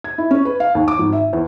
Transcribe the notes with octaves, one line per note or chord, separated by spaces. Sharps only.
G#6
E4
C#4
B4
F5
D#2
D6
G#1
E5
E2